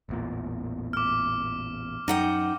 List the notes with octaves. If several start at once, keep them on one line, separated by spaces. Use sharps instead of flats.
A1 E2 A#2
D6 F6
F#2 D#4 F#5 G5